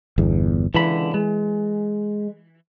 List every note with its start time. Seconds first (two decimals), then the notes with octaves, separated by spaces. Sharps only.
0.18 G1 E2
0.74 C#2 D3 E3 B5
1.14 G#3